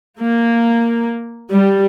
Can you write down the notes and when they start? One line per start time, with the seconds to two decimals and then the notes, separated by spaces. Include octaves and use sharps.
0.20 A#3
1.50 G3